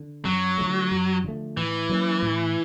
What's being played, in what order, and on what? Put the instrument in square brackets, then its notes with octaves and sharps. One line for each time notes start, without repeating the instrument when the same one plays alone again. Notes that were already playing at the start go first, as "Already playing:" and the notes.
Already playing: [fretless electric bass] D3
[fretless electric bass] F#2 [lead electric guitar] F#3
[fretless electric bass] D3 F3 A3
F#2
D3 F3 A3
[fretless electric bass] A2 [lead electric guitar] E3
[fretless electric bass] F#3 A#3 C#4
A2